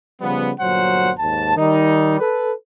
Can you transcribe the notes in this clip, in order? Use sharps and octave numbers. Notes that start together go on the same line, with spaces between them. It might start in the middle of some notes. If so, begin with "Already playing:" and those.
C#3 F3 G3 B3
G1 A#2 F#3 C5 F#5
D#2 G#2 A5
D#3 G3 D#4
A4 B4